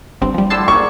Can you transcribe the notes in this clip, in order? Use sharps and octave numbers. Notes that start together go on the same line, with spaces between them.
G1 G2 C4
F3 G3
A2 D3 G3 A5 C6 E6
A#3 G#4 C#6